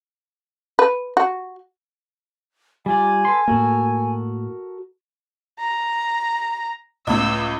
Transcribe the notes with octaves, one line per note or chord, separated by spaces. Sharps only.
B4
F#4
G3 F4 D5 G#5
A4 B4 C6
A2 A#3 F#4 A4 A#4
A#5
C#2 A2 E6